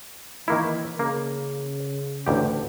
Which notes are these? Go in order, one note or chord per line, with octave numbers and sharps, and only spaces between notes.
D#3 E3 A#3 E4
C#3 A#3
A1 D2 G4